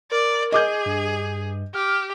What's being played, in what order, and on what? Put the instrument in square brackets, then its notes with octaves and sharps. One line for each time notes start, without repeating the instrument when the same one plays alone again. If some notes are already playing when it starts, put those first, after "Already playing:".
[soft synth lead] A#4 [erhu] D5
[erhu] G#4 [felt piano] D#5 D6 G6
[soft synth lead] G2
[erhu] G4 [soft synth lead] F6